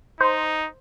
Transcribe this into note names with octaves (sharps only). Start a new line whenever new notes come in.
D#4 C5